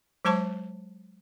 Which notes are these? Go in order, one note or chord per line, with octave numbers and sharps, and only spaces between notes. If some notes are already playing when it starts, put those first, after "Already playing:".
F#3 G#3 C5 A5 C#6